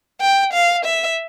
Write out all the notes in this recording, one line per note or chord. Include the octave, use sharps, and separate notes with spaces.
G5
F5
E5